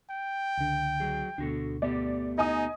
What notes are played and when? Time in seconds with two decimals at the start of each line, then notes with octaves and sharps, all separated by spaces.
0.10 G5
0.58 C#2 D3
1.00 F#3 G#4
1.38 D2 B2 D4 F#4 A4
1.82 A3 B3 G4 D5
2.38 D#4 D#5 G#5 D#6